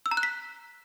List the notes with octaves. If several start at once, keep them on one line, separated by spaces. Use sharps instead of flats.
E6
A#5
F#6
B6